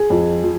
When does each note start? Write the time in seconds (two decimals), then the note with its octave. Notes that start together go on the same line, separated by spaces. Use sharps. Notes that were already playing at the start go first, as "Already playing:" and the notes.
Already playing: G#4
0.10 F2
0.43 F3